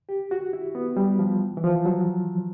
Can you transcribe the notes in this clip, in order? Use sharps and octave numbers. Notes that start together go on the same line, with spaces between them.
G4
F#4
E4
B3
G3
F3
E3
F3
F#3